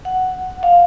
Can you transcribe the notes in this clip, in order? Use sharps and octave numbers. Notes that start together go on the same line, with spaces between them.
F#5
F5